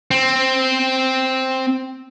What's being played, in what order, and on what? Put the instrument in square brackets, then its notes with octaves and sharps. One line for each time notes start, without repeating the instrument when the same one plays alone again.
[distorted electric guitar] C4